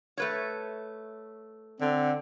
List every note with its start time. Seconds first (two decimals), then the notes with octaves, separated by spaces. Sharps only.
0.17 A3 B4 C#5
1.81 D3 C4